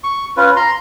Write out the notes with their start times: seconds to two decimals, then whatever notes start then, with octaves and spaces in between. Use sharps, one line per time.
0.04 C#6
0.37 C#4 F4 B4
0.56 A#5 C6